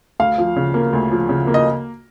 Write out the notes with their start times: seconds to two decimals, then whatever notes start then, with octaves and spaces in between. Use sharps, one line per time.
0.20 D2 F5
0.38 F3
0.56 C#3
0.74 A#3
0.93 D2
1.11 F3
1.29 C#3
1.47 A#3
1.54 D#5